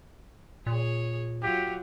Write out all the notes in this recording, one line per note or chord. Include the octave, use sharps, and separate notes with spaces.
A#2 G#4 C#5
F#3 F4 G4